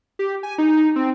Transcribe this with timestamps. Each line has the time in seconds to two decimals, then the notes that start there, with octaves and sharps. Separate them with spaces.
0.19 G4
0.43 G#5
0.58 D#4
0.96 C4